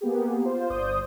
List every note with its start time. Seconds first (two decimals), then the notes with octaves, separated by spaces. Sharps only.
0.01 A#3 B3 G4 G#4
0.44 F4 C5
0.70 G1 C5 D5 D#6 G6